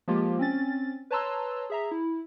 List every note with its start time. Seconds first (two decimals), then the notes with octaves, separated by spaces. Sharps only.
0.08 F3 G#3 A#3 F4 G4
0.39 C4 C#4 A6
1.11 B4 C#5 A5 A#5 C6 E6
1.70 G#4 E5 A#5
1.91 E4